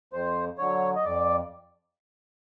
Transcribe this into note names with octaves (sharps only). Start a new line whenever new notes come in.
F2 C5
D3 F#3 C#5
D#5
F2 D5